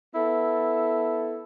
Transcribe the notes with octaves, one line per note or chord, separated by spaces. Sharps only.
B3 E4 A4